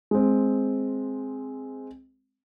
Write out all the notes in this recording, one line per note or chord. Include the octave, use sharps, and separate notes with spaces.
G#3 C4